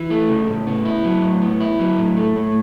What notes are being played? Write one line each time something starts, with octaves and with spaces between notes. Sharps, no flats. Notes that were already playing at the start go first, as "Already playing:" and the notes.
Already playing: E3
A3
C#3
A2
B3
E4
F#3
A2
B3
E4
F#3
A2
A3
A2